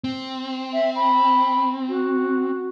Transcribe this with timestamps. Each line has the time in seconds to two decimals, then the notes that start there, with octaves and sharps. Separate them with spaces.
0.04 C4
0.72 E5
0.95 B5
1.88 F#4